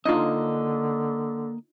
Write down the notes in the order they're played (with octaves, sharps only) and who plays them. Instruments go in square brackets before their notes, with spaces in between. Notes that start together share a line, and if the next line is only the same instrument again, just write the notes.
[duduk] D3 [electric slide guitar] A#3 D#5 [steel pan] D4 D#4 F4